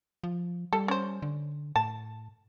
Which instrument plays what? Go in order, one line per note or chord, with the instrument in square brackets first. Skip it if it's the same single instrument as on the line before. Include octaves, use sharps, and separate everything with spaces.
[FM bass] F3
[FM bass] G3 [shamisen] A4
[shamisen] C#4 C5
[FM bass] D3
[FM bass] A2 [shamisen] A5